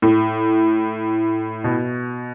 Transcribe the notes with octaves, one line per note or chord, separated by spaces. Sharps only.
A2
B2